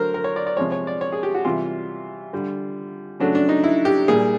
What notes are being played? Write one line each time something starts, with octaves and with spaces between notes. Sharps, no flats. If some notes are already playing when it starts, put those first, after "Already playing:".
Already playing: D3 F#3 A3 A#4 C5
A#4
C#5
D5
D5
C3 F3 G#3 C#5
C#5
D5
C#5
G#4
G4
F#4
C3 E3 G3 F4
D3 G3
C#3 F#3 A3 D4
D4
D#4
E4
G4
A#2 G3 G#4